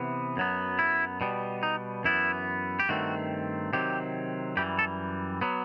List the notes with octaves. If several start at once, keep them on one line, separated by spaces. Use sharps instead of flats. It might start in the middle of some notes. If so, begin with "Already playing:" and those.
Already playing: C3 E3 B3
F#2 F#3 B3
E4
B2 G3 B3
D#4
F#2 E3 B3 E4
G4
G2 D#3 A3 C4 F#4
C3 D#3 F#3 C4 G4
F#2 E3 G3 G4
A4
F#3 B3